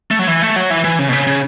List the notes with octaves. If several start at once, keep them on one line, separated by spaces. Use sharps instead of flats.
A3
F#3
E3
A3
F#3
E3
E3
C#3
B2
C#3
C#3